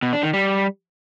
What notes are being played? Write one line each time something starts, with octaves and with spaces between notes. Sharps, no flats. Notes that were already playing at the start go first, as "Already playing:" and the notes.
B2
D4
D#3
G3